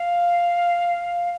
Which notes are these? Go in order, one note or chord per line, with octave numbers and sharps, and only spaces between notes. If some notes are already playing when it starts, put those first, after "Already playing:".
Already playing: F5